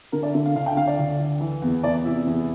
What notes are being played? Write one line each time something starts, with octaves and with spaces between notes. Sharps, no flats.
D3 A#4
D5
D3 E5
F5
D2 F5
G5
D3 F5
D5
D2
D2
E3
E2
E2 D5
C3 E4
E2